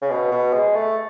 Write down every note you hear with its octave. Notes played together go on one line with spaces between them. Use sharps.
C#3
B2
B2
G#3
A3